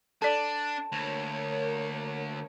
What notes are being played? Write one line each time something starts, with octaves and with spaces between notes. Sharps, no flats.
D4 A4 D5 A5
D2 A#3 A#4 C#5